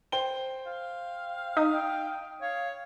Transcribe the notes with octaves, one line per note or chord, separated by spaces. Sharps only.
C5 G5 G7
F5
D#4 D#6
G5
C#5 F5